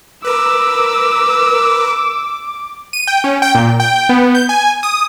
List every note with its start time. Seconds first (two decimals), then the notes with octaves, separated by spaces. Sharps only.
0.24 A#4 B4 D6 E6
2.93 D#7
3.07 G5
3.24 C#4
3.42 G5
3.55 A#2
3.80 G5
4.09 B3
4.35 G6
4.49 G#5
4.83 D#6